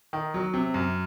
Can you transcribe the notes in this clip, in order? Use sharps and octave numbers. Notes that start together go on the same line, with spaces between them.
D#3
F#3
C3
F#2